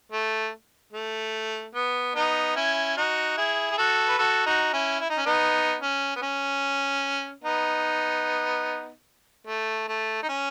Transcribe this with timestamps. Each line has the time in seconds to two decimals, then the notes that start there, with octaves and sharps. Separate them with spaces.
0.12 A3
0.93 A3
1.75 B3
2.15 B3 D#4
2.56 C#4 E4
2.97 D#4 F#4
3.37 E4 G#4
3.72 G#4
3.78 F#4 A4
4.08 B4
4.18 F#4 A4
4.47 D#4 F#4
4.73 C#4 E4
5.00 E4
5.10 D#4
5.18 C#4
5.26 B3 D#4
5.81 C#4
6.16 B3
6.22 C#4
7.44 B3 D#4
9.48 A3
9.89 A3
10.23 D#4
10.29 C#4